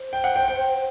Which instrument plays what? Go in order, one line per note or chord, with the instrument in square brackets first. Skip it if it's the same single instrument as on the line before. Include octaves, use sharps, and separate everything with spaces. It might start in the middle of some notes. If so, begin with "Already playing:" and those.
Already playing: [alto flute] C5
[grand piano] G5
F#5
G5
G5